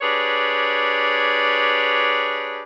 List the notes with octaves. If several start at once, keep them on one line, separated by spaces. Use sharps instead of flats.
D4 G4 G#4 B4 C#5